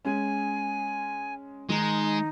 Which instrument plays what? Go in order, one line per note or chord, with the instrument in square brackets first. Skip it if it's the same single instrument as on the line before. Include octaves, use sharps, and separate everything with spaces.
[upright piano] G#3 C#4 [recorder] G#5
[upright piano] D#3 [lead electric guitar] G#3 [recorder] D#4